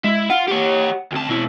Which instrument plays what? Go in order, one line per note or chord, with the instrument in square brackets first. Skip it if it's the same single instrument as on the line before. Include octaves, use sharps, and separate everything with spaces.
[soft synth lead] G#3 [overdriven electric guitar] E4
[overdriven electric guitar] F4 [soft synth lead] F#5
[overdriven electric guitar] G4 C#5
[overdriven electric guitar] D2 A5 [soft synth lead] C4
[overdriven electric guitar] B2 E4